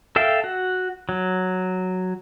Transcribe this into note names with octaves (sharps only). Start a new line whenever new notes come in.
A4 E5 F5 G5
F#4
F#3